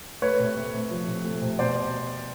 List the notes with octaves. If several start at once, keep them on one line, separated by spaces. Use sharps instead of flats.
A3 B4 C#5
C3
A3
C3
F3
C3
A3
C3
B2 C5 D5